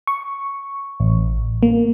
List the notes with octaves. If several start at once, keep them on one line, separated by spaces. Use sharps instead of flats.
C#6
A1
A#3